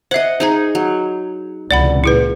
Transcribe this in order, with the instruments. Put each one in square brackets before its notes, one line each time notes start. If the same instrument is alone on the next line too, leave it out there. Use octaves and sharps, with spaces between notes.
[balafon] C5 E5 [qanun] D#5 F#5
[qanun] D#4 G#4 [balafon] C5 A#5
[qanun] F#3
[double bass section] C#2 C3 E3 [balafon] D5 F#5 B5
[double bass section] A#2 [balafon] E4 G#4 B4